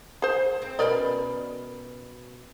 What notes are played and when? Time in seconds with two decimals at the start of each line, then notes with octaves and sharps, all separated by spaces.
0.22 G#4 C5
0.62 C4
0.79 B2 C#4 A#4 B4 D5 D#5